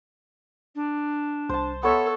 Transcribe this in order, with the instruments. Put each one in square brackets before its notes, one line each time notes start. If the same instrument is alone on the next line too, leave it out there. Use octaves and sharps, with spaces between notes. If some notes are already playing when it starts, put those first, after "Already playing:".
[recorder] D4
[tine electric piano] C2 [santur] C5 A5
[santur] B3 C#5 E5 [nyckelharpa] A4